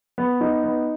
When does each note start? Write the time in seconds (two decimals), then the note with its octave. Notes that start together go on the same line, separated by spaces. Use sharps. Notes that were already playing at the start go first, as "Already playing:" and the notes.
0.18 B3
0.41 D#4
0.64 B3